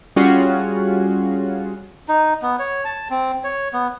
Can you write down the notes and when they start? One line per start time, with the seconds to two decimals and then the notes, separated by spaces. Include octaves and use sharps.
0.16 G3 C#4 F4 F#4 G#4
2.09 D#4
2.42 B3
2.59 C#5
2.84 A5
3.10 C4
3.44 C#5
3.73 B3